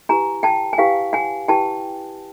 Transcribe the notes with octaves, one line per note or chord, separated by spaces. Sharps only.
E4 G4 B4 G#5 A#5
G5 A5
G#5
E4 G4 B4 F5 G5
F#5 G#5
E4 G4 B4 G5 A5